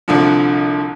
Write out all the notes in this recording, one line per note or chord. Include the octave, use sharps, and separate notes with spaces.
C2 D3 F3